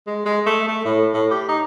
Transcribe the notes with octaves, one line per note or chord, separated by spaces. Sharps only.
G#3
G#3
A3
A3
A2
A2
G4
D#4